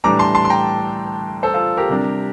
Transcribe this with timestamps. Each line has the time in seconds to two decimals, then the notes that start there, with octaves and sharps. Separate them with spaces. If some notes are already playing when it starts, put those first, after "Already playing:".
0.04 A2 E3 G3 D4 A#5 D6
0.19 A5 C6
0.35 A5 C6
0.45 C6
0.50 G5 A#5
1.43 A4 C5
1.54 F4 A4
1.77 G4 A#4
1.89 C3 G3 D4